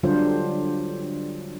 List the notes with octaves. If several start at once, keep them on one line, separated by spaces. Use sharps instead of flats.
D3 F#3 G3 D4 F4 C5